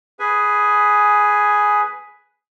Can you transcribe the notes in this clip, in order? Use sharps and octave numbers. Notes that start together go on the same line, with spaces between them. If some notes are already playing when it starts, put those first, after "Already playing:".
G#4 B4 G#5